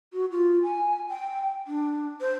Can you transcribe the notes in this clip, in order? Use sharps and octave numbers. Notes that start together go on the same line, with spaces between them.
F#4
F4
G#5
G5
D4
C5